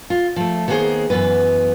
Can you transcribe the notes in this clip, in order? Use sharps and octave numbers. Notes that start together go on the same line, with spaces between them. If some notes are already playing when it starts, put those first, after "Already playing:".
F4
F3 A3
D#3 A#3 B3 F#4 G#4 C5
F#2 E3 B3 B4